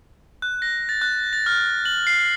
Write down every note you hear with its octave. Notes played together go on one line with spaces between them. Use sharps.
F#6
A#6
A6
F#6
A6
F6
F#7
C7